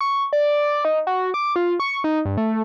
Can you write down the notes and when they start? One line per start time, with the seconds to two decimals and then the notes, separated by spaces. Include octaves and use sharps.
0.01 C#6
0.33 D5
0.85 D#4
1.07 F#4
1.34 D6
1.56 F4
1.80 C#6
2.04 D#4
2.25 G2
2.37 A3